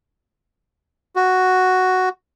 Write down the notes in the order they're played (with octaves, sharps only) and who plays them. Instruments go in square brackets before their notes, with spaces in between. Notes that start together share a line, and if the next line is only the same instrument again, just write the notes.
[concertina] F#4